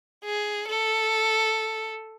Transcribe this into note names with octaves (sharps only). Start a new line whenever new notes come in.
G#4
A4